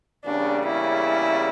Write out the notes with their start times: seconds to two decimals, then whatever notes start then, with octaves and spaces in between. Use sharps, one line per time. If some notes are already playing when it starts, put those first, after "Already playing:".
0.24 E2 C#3 G3 A#3 C#4 D4
0.67 E4